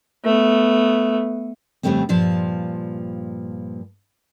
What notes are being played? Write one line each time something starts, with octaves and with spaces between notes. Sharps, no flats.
A3 B3
F2 G#2 C#3 G3 A3 C4
G2 A#2 F3 A5